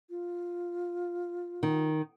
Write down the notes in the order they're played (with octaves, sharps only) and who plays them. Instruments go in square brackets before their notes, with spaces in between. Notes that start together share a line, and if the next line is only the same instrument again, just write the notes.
[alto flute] F4
[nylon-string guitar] D#3